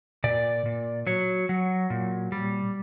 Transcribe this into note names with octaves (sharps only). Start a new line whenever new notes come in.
A#2 D5
A#2
F#3 C#5
F#3
A#2
G3